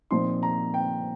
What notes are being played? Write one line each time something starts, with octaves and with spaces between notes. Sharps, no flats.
A#2 F3 C4 D#4 C6
A#5
G5